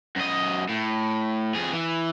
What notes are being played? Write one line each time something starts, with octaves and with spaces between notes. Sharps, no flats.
F#2 D#5
A2
F2 G#4
E3